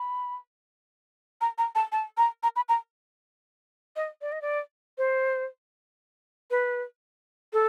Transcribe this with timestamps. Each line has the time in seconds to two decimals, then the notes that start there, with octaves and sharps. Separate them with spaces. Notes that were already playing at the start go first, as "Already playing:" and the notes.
Already playing: B5
1.41 A#5
1.58 A#5
1.75 A5
1.92 A5
2.17 A#5
2.43 A#5
2.56 B5
2.69 A#5
3.96 D#5
4.22 D5
4.32 D#5
4.42 D5
4.98 C5
6.51 B4
7.53 A4